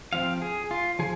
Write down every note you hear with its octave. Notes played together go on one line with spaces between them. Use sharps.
F3 C4 F5
G#4
F4
F3 G#4